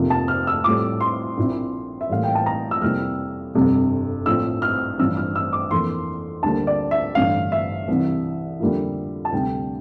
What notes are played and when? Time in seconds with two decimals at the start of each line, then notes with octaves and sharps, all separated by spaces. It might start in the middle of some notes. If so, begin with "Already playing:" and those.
Already playing: F1 F2 C3 F3 A#3
0.10 A5
0.28 F6
0.47 E6
0.64 A2 G3 C4 F4 D6
1.01 C6
1.38 A#1 A#2 F3 C4 E4
2.01 E5
2.10 A1 A2 G3 A#3 F5
2.23 G5
2.35 A5
2.46 A#5
2.71 E6
2.81 F2 C3 G3 A#3 E4 F6
3.55 G1 F2 C3 G3
4.26 A#1 A2 F3 C4 E6
4.62 F6
4.98 A1 G2 F3 C4 E4 E6
5.17 F6
5.36 E6
5.53 D6
5.71 F2 E3 A#3 C6
6.43 D2 D3 G3 A#3 A5
6.67 D5
6.91 E5
7.15 A1 G2 D3 F5
7.52 E5
7.88 C2 C3 E3
8.60 F2 D3 G3 A#3 F4
9.25 A5
9.32 D2 C3 G3 D4 G5